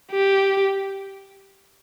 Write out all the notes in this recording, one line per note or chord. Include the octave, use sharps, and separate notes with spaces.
G4